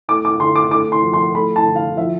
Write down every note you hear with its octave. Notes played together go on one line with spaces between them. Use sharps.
A3 D6
D6
D3 C6
D6
A3 D6
C6
F3
C6
A3 B5
A5
D3
F5
F3 E5